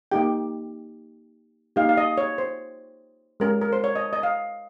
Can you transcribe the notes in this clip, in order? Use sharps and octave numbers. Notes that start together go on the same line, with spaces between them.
A#3 D#4 G4 G5
A#3 D#4 G4 F5
F5
D#5
C#5
C5
G#3 C#4 G4 A#4
A#4
C5
C#5
D#5
D#5
F5